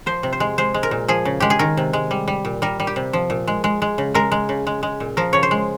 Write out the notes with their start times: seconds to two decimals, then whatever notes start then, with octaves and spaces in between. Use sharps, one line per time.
0.06 F3 C5
0.23 C3
0.33 C5
0.40 G#3
0.58 G#3 C5
0.74 G#3
0.83 A#4
0.91 A#2
1.08 F3 G#4
1.25 C#3
1.40 G#3 G4
1.50 G#4
1.59 D#3 A#4
1.77 C3
1.93 G#3
2.11 G3
2.28 G3
2.45 A#2
2.62 G3 A#4
2.80 G3
2.87 G4
2.96 C3
3.13 F3
3.30 A#2
3.47 G#3
3.64 G#3
3.82 G#3
3.98 C#3
4.14 G#3 A#4
4.32 G#3
4.49 C#3
4.67 G#3
4.83 G#3
5.00 A#2
5.17 F3 A#4
5.33 C#3 C#5
5.43 C5
5.51 G#3